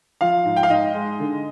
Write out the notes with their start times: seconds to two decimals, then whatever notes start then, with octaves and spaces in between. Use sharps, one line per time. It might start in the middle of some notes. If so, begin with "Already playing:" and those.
0.21 F3 F5
0.45 G#2
0.56 G5
0.63 F5
0.70 G#2 D#5
0.95 G#3
1.20 D3